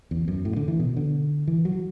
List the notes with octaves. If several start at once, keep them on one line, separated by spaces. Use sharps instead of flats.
E2
F#2
A2
D3
E3
B2
D3
E3
F#3